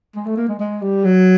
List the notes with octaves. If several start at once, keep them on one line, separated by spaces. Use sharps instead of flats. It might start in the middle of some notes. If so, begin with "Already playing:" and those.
G#3
A3
A#3
G#3
G#3
G3
F#3